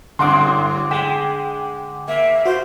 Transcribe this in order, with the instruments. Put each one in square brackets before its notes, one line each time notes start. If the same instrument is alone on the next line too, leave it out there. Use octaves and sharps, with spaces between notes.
[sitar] F#2 A2 C4 [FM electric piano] D3 F#5 D6 [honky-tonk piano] C6 D#6
[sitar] G#3 [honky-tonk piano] G5 B6 E7
[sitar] A#3 [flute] E5
[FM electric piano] F#4 [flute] C5